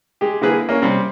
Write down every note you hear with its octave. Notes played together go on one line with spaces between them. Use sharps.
G#3 G4
D3 A#3 E4 G#4 B4
A#3 C#4
C3 G3 C4